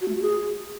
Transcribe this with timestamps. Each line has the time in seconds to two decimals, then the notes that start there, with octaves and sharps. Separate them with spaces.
0.01 F#4
0.08 A3
0.15 F#4
0.22 G#4